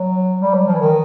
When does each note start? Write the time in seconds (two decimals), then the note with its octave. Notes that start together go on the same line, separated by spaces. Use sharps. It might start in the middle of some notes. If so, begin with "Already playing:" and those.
Already playing: F#3
0.41 G3
0.54 F#3
0.67 F3
0.75 E3
0.80 D#3